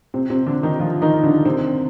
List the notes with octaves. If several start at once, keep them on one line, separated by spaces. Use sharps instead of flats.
C3 C4
C3 C4
D3 D4
D#3 D#4
F3 F4
D#3 D#4
D3 D4
C3 C4